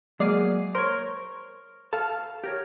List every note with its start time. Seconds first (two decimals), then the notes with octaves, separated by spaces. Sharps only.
0.20 F#3 G#3 A#3 G#4 D5 C7
0.75 A#4 C5 C#5
1.93 A4 F5 A5
2.44 G4 A#4 C#5